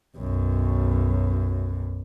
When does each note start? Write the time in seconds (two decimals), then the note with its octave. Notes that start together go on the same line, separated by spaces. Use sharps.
0.17 B1 F#2